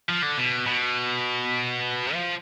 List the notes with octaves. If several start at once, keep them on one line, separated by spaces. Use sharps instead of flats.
F3
D3
B2
B2
F3